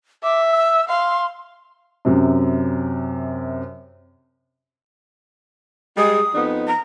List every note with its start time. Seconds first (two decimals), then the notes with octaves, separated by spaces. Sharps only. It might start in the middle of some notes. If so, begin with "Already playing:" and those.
0.23 E5 D6
0.52 E6
0.89 F5 C6
2.05 F#2 C3
5.97 G3 G#3 D#6
6.35 F2 B3 D#4
6.67 A#5